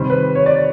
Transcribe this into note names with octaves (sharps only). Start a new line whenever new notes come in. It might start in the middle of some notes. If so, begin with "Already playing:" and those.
Already playing: C3 D#3 G3 C5
B4
C#5
D5